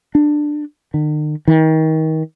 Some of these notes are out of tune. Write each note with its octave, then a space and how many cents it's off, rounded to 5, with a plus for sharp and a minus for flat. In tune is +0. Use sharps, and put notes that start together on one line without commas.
D4 +15
D#3 -45
D#3 +30